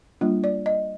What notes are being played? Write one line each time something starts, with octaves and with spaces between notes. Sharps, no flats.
G3 A#3 D4 F4
D5
D#5